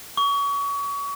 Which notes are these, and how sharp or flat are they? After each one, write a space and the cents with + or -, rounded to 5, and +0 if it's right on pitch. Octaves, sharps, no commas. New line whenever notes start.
C#6 +30